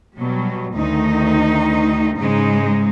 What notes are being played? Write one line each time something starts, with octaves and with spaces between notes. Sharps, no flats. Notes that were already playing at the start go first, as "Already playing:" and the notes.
B2 F#3 G3
D2 D#3 D#4
G#2 C#3 G#3 D#4